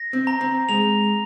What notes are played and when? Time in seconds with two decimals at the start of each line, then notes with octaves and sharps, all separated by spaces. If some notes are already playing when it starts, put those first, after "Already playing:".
Already playing: A#6
0.13 C4
0.27 A#5
0.41 C4
0.69 G#3 F7